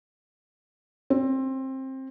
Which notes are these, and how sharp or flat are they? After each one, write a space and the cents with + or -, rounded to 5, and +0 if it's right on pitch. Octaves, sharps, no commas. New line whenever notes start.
C4 +20